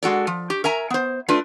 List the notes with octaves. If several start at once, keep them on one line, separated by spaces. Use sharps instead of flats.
G#3 F#4 A4 D5
F3
G4
A#4 E5 G#5 A#5
B3 C5
A3 D4 F4 B4